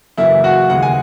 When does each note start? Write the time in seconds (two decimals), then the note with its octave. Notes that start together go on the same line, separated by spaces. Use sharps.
0.18 F#2 C#3 E3 A#3 E4 E5
0.44 F#4 F#5
0.70 D#2 C#3 G#3 F#5
0.82 G#5